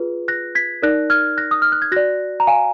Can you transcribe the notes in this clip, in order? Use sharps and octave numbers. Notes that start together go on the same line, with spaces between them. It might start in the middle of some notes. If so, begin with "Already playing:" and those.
Already playing: F4 G#4 B4
F#6 A#6
G#6 B6
D#4 A#4 D5 F#6 A#6
F6 G#6
F#6 A#6
D#6
F6
F#6
G#6
F#4 D5 F#6 A#6
A#5
F5 G#5